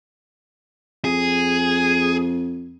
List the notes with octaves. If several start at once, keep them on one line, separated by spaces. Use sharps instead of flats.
F2 G#4